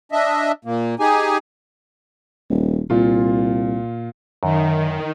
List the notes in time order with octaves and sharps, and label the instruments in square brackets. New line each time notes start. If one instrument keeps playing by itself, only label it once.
[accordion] D4 D#5 E5
A#2 A#3
D#4 G4 G#4 G#5
[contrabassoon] D#1
[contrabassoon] C2 [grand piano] A#2 F4
[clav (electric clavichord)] F#2 [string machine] D#3